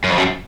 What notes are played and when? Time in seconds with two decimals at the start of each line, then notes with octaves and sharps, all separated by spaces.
0.04 F#2
0.10 F2
0.17 F#2